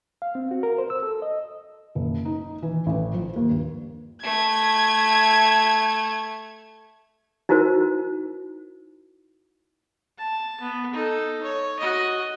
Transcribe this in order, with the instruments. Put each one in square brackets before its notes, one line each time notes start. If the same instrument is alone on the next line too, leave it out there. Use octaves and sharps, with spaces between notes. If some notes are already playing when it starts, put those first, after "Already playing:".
[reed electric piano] F5
C4
F#4
A#4
C5
E6
A4
D#5
[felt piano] F#1
D#4
E3
A1
F3
D#2
G2
[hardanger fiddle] A3 [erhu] G#6
[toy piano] D#4 E4 F#4 A#4 C5
[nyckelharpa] A5
B3
D#4 A4
C#5
F#4 D#5